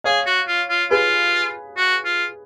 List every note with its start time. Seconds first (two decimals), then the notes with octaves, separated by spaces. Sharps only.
0.04 G#4 C#5 F5
0.26 F#4
0.48 F4
0.69 F4
0.90 F4 G#4 B4
1.77 F#4
2.05 F4